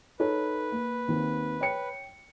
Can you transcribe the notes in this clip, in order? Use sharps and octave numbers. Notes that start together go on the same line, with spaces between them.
D#4 A4 B4 C#5
A#3
D#2 D#3 C4
C#5 G5 C#7